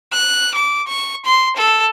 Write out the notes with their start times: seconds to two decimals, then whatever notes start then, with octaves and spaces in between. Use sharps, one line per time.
0.13 F#6
0.55 D6
0.88 C#6
1.26 C6
1.57 A4